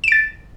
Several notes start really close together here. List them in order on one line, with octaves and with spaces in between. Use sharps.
E7 D7 A6